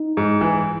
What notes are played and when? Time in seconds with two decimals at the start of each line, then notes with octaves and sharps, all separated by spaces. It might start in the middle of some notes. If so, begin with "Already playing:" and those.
Already playing: D#4
0.17 G#2
0.41 E3